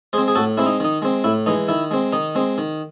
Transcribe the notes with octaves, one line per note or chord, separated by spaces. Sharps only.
G#3 C4 G#4 C5
G#4
A2 F#4 A4
G#3 C4 E4
D#4
D#3 D#4
G#3 C4
A2 E4
E3 G#3 D#4
D#3 E4
G#3 C4
D#3 D#4
G#3 C4
D#3